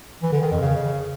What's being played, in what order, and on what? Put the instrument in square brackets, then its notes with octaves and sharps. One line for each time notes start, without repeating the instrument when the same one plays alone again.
[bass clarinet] E3
D3
D#3
F2
C#3